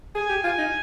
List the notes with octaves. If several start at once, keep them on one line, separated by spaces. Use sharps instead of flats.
G#4 G#5
G4
F4 G#5
D#4